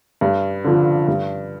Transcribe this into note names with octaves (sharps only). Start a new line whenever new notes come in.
G2
D3 F3
G2